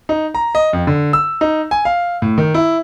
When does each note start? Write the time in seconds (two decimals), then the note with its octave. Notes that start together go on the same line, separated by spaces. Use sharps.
0.09 D#4
0.35 A#5
0.55 D#5
0.73 F2
0.87 D3
1.13 E6
1.41 D#4
1.71 G#5
1.85 F5
2.22 A2
2.38 D#3
2.54 E4